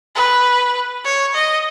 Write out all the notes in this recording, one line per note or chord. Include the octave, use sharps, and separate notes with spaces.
B4
C#5
D#5